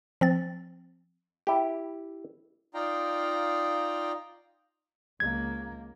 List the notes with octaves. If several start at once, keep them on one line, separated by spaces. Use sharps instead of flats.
F3 C4 A6
E4 G4
D#4 F4 D5 F5 G5 A#5
C#2 A#3 G#6